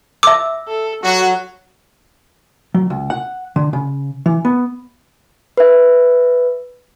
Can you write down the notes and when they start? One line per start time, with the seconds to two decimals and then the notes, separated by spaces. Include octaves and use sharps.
0.23 E5 D6 E6
0.68 A4
1.04 F#3 F#4
2.74 F#3
2.90 C#2
3.10 F#5
3.56 D3
3.73 C#3
4.26 E3
4.45 B3
5.57 B4 E5